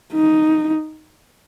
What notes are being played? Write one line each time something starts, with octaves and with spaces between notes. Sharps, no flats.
D#4